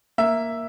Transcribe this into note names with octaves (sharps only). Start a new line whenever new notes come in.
A#3 E5